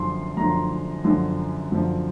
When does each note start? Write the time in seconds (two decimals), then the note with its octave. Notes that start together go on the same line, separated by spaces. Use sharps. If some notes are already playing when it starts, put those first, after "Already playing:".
Already playing: F#2 D3 F3 C6
0.37 F#2 D3 F3 A#5
1.04 F#2 D3 F3
1.72 F#2 D3 F3